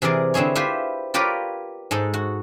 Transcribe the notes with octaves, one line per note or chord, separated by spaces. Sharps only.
C3 E3 G#4 A#4 D5
D3 C4 E4 G#4 C#5
E4 F4 G4 B4 C5 E5
F4 G4 A#4 B4 C#5 D5
G#2 G#3 A4 D#5
F#4